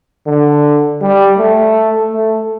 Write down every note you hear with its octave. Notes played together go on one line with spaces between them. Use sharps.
D3
G3
A3
A3